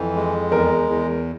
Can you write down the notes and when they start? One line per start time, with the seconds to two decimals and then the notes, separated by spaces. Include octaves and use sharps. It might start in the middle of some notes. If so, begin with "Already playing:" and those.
Already playing: F2 E3
0.16 G#3
0.51 E2 A#4
0.89 E2